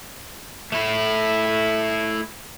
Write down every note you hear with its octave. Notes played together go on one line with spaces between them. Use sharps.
A3 E4